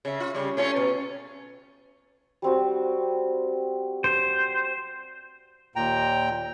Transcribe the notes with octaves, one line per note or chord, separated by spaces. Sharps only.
C#3 E5
F4
C#3 G3
A3 C#4 F4
B2
G3 C4 F#4
C5
D#2 A#2 G5 A#5